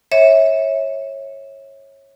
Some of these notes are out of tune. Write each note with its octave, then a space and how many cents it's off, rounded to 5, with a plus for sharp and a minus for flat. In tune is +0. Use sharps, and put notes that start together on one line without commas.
C#5 -20 E5 -25